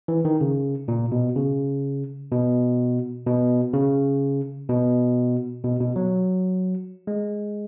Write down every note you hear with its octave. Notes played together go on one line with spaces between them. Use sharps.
E3
D#3
C#3
A#2
B2
C#3
B2
B2
C#3
B2
B2
B2
F#3
G#3